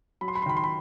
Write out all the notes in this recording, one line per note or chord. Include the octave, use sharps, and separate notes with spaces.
F#3 B5
C6
B5
C6
D#3 B5
C6
B5